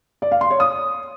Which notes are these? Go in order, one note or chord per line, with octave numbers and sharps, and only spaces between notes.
D5
F5
C6
C#5
D#6